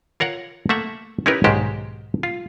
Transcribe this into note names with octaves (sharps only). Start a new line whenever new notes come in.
F4 A#4 C#5 F#5
A3 A#3 E5 F#5
C#4 D#4 E4 G4 A#4 B4
B1 G#2 D#3 G#3 G4 C5
F4